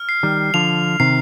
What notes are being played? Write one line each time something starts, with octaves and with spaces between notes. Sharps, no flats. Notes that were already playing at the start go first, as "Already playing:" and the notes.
Already playing: F6
C7
D#3 G3
D3 F3 F7
C3 D#3 C7